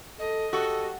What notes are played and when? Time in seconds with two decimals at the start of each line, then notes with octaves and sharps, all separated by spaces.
0.19 A4 D#5
0.53 F#4 G4 A4